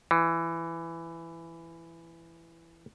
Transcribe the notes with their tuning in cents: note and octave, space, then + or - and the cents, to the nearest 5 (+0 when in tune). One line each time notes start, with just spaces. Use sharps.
E3 +15